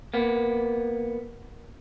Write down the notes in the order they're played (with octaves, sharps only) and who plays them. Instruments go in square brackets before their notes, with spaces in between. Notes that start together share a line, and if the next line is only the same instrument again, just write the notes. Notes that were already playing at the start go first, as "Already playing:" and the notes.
[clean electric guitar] A#3 B3